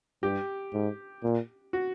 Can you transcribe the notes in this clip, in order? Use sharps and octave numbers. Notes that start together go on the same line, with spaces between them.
G2 G4
G#2
A#2
F#4